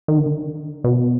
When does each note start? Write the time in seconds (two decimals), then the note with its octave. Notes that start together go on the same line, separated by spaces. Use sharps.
0.08 D#3
0.18 D3
0.84 B2